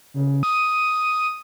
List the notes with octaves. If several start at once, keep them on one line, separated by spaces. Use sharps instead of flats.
C#3
D#6